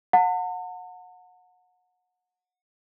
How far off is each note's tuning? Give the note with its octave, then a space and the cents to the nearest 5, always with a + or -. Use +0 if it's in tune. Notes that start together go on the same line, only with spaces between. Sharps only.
F#5 -25 A5 +45